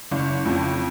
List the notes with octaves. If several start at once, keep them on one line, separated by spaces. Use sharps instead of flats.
F#1
F2